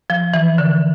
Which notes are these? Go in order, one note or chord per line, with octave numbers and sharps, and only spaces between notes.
F3
E3
D3